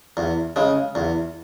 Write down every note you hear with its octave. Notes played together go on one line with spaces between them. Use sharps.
E2
C#3 G#3
E2